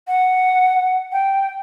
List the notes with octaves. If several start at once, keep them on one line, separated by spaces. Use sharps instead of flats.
F#5
G5